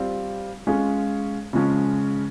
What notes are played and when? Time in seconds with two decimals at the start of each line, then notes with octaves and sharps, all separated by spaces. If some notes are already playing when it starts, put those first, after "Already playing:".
Already playing: G3 C4 F4
0.67 G#3 C#4 F4 G#4
1.53 C#3 F3 G#3 C#4